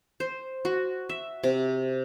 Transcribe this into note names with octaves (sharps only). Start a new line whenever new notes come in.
C5
F#4
E5
C3